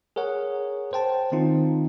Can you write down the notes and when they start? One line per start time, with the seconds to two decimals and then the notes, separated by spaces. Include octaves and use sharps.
0.16 G#4 A#4 C#5 F#5
0.93 C5 G5 A5
1.32 D#3 C4 D#4 F4